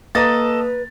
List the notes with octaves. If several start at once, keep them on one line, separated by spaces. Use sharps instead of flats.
A#3 A4 B4 D#5 A#5 D#6 A6